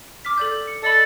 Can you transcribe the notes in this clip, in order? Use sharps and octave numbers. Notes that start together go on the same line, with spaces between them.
D6 F6 B6
A4 D5 G6
C#7
A4 D5 D#5 B5